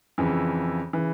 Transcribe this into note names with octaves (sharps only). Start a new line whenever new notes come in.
F2 C#3 E3
C#3 E3